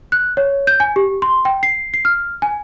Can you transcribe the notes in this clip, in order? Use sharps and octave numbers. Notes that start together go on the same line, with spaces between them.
F#6
C#5
G6
G#5
G4
C6
G5
C7
C7
F6
G#5